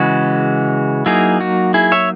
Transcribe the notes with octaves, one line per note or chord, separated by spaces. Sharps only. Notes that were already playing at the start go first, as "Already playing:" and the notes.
Already playing: C#3 E3 G#3 F#4
F#3 A#3 D#4 E4 G#4
F#4
E4 G#4
C#5 E5